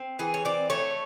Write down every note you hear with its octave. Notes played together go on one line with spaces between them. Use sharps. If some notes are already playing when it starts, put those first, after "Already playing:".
Already playing: C4
E3 G#4
C#5
C4 D5
A3 C#5